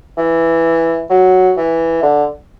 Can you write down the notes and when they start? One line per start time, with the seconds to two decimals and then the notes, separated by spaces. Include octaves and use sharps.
0.18 E3
1.10 F#3
1.57 E3
2.03 D3